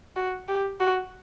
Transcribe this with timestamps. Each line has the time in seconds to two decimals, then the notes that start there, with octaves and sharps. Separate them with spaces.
0.16 F#4
0.48 G4
0.80 F#4